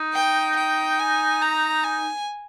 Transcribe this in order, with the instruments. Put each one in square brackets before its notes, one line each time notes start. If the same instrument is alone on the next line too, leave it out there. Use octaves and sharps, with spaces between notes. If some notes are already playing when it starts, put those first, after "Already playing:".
Already playing: [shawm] D#4
[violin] G5
G5
G#5
A#5
G#5